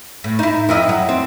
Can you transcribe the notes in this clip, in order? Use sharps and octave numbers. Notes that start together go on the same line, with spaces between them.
A2
D#4 E4
F2 E4 D#5
F#3
C4